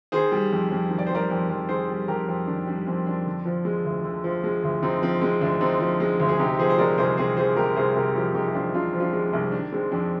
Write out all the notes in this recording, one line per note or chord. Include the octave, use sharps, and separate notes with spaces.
D#3 G#4 C5
G3
F2
F2
D#3
D5
C5
G3 A#4 D5
F2
F2
D#3 G#4 C5
G3
F2 G4 A#4
F2
D#3 D4
G3 D4
F2 C4
F2 D4
D3
F3
G#3
D2
D3
F3
G#3
D2
D3 C4 D#4
F3 C4
G#3 C4
D2 D4
D3 C4 D#4
F3
G#3
D2
G#4
C3 D#4 G4
F3 G#4 C5
C5
G#3 A#4 D5
C2 G#4 C5
C3 G#4 C5
F3 G#4 C5
G#3 G4 A#4
C2 G#4 C5
C3 G4 A#4
F3 D#4 G4
G#3 D#4 G4
G4
C2 D4 F4
C3 D4 F4
F3
D4 F4
G#3
D4
C2
D#3 D4
G#3 C4
F2 D4